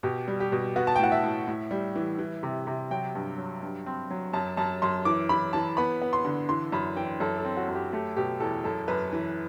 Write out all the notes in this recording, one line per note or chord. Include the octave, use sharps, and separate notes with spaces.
B2 G4
G3
G4
B2
B3 F#4
A5
G5
A2 F#5
E5
A2
A2
G3
E3
E3
C3
C3
F#3 G5
G2
F#3
G2
C4
F#3
F#2 A5
F#2 A5
F#2 C6
E3 D6
E3 B5
E3 A5
B3 B5
B3
C6
D3
E3 C6
F#2 B5
E3 G5
F#2 A4
A4
C4
F#4
F#2
G4
A3 G4
B2 G4
E2 A4
F#2 A4
F#2 B4
E3